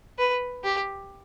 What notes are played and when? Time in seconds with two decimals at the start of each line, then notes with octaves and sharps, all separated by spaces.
0.18 B4
0.64 G4